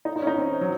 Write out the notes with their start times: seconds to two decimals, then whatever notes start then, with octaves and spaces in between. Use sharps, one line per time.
0.05 D#4
0.16 D#4
0.22 C#4
0.27 D#4
0.38 C4
0.61 F#3